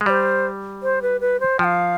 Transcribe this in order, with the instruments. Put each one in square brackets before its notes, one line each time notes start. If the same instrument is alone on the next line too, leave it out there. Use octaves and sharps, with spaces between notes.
[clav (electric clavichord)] G#3
[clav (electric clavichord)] G3 [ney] D5
[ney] C5
C5
B4
B4
C5
[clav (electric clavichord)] F3 [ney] G5
[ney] F5